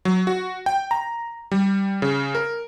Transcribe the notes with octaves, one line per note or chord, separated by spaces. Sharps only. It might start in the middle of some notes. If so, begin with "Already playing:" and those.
F#3
F#4
G5
A#5
G3
C#3
A#4